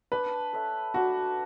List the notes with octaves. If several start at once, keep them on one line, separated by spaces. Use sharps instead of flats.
D4 B4
A4 C#5 E5
D4 F#4